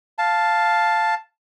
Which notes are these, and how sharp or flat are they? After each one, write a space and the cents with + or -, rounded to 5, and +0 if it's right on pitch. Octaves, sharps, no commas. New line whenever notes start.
F5 +0 A5 +0